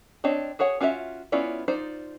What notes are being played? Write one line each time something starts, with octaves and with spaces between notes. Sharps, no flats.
C4 D4 C#5 D#5
F#4 G#4 C#5 F#5
C#4 F4 F#4 D5 E5
B3 C#4 E4 F4 D5
D#4 F4 C5 D5